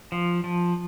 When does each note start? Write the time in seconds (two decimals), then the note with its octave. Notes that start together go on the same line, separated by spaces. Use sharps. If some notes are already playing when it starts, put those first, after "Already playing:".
0.12 F3
0.44 F3